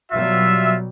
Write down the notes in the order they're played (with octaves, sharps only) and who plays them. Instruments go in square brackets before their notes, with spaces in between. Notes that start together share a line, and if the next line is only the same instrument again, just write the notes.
[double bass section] B2 F#3 G3 [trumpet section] F4 E5